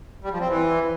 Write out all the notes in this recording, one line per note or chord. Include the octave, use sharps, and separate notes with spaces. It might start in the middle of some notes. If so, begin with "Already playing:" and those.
G3
F3
C4
E3